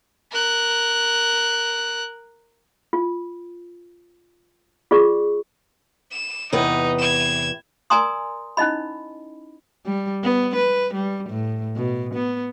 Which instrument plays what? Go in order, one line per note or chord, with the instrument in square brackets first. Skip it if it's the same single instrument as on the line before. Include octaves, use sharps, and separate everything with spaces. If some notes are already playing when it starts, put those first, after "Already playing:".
[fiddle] A#4 F#6
[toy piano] F4
F4 G#4 D5 C#6
[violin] E7
[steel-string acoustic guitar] E2 C3 B4 [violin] D#4
[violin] G#6 E7
[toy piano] A#4 D5 G#5 A#5 C6 D#6
C#4 D#4 E4 D#5 B5
[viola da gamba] G3
B3
B4
G3
A2
B2
B3